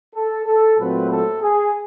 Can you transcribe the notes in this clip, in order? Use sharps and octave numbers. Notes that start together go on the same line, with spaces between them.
A4
A4
A#2 F#3 A3 C4 B4
A4
G#4